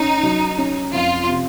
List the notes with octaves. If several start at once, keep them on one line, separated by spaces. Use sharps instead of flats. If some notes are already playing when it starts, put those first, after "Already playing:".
Already playing: C#4 D#4
F#3
C#4
F2 F4
C3